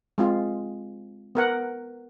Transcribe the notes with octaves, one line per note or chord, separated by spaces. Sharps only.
G#3 C4 F4
B3 A#4 F#5